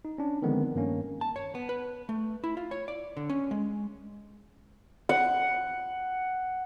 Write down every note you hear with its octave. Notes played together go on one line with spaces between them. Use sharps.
D#4
C#4 D4
D3 D#3 F3 G#3 B3 C4
G2 D#3 A#3 C#4
A5
C#5
B3
B4
A3
E4
F4
C#5
D5
D3
C#4
G#3
F#5